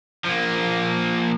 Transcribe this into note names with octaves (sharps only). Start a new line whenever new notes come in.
F3 A#3